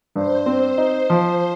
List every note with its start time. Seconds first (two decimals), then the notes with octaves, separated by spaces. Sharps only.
0.15 G2 C5
0.46 C4
0.78 D#4
1.10 F3